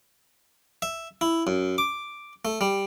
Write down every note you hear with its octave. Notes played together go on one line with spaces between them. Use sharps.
E5
E4
F#2
D6
A3
G3